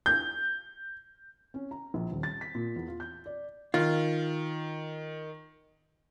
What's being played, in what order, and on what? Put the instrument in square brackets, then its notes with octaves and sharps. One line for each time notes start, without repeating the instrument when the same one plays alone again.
[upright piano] G6
[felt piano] C#4
A#5
A#1
D#1
A6
B6
A#2
E2
F4
G6
D5
[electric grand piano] D#3 [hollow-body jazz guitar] F4